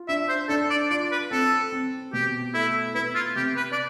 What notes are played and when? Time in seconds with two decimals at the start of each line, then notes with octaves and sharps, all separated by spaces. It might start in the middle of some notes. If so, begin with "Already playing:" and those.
Already playing: F4
0.08 D4 E5
0.29 C5
0.49 D4 A4
0.70 D5
0.90 F4 D5
1.12 B4
1.31 C4 A4
1.72 C4
2.13 B2 G4
2.54 A3 E4
2.95 B3 E4
3.15 F4
3.36 C3 G4
3.57 B4
3.72 D5